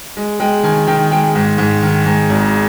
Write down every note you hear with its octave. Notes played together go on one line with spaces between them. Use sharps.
G#3
G#3 G5
D#3 G#5
D#3 G5
G#3 G5
G#2
G#2
D#3
G#2
G#1